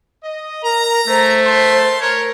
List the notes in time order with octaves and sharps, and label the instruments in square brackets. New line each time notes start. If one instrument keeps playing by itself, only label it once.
[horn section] D#5
[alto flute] A#4 [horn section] A#5
[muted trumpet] A3 [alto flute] C5
[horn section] A#4 A5 C6
[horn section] A#4 [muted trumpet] C#5